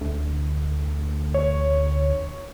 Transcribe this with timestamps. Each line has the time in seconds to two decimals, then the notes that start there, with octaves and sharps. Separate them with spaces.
0.01 D2
1.34 C#5